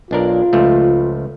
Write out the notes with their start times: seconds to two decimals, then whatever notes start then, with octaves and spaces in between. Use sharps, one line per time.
0.11 B1 D4 F4 A#4
0.53 C#2 F3 A3